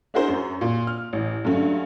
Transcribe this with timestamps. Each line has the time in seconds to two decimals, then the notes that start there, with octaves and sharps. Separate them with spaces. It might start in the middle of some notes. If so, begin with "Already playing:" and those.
0.14 D4 E4 F#4 G#4 A#4 C5
0.28 F#2
0.61 A#2
0.87 F6
1.13 A1
1.44 G2 D3 F#3 A3 C#4